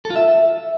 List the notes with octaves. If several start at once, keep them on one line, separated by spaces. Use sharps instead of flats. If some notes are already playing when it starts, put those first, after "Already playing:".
A4
F4
E5